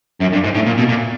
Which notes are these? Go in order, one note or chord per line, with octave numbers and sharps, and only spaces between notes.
F#2
G2
G#2
A2
A#2
B2
A#2